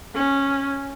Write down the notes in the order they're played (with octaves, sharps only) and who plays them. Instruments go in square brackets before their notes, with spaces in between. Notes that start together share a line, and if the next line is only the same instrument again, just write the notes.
[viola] C#4